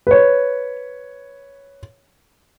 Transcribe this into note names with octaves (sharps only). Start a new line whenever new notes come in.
B4 C#5